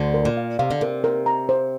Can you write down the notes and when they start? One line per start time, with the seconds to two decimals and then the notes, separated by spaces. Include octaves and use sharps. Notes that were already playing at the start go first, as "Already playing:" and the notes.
Already playing: D2 D3
0.14 A#4
0.25 A#2
0.37 F5
0.59 C3 F5
0.71 D3
0.81 C3 A#4
1.04 A#4
1.26 A#5
1.49 C5